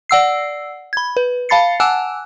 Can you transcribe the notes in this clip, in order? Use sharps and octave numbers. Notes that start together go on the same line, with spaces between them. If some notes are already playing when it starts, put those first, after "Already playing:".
D5 F#5 E6 C7
B5 G#6
B4
F5 A5 B5 A6 C7 C#7
F#5 G#5 A5 D6 E6 F#6